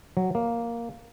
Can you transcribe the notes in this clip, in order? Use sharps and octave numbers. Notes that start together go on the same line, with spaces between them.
F#3
A#3